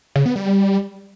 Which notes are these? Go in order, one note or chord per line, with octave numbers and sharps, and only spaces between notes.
C#3
B3
G3